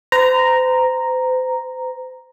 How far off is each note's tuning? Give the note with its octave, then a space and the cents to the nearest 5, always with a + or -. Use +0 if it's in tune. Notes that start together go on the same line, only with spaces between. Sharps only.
C5 -40 A#5 +0